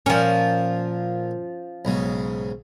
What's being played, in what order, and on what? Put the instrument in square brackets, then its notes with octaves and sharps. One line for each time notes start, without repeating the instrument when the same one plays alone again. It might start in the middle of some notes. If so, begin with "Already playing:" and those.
[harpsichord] A#2 A#4 [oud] F3 C#4
[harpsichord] B1 G#2 C#3